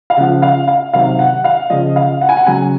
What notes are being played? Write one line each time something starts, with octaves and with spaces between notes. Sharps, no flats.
F5
C#3 F3 F#5
F5
F5
C3 D#3 F#3 F5
F#5
F5
C#3 F3 D#5
F5
F#5
G#5
F#5
C#3 F#3 G#5